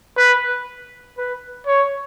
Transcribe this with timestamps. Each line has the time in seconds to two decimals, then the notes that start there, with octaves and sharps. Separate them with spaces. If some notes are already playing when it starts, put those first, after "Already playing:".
0.17 B4
1.17 B4
1.67 C#5